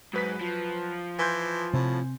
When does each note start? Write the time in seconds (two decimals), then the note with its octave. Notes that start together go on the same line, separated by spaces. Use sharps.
0.13 G#2 F#3 B4 B6
0.41 F3
1.19 E3 G#5 C6 G6
1.73 A2 C3 C4